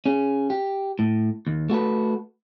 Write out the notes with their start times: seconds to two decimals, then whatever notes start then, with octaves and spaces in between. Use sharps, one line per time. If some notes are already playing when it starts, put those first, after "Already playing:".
0.06 C#4 G#4
0.50 G4
0.99 A2
1.47 D#2
1.70 A3 F#4 A4 B4